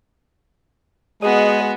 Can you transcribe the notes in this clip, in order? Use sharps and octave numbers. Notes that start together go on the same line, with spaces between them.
G#3 B3 F#4 G#4 D#5